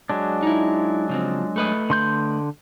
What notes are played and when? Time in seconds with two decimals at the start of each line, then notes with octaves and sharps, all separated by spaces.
0.10 F#3 G#3 D4
0.43 D#4 E4
1.09 C#3 F3 C4
1.56 A3 B4 D#5
1.90 D3 C6 G6